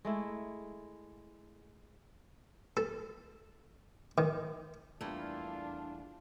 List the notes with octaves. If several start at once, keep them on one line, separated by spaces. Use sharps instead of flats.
G#3 A3 E4
A4
D#3
E2 G3 A3 A#3 D4 E4 F4